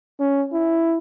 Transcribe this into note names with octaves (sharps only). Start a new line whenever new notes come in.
C#4
E4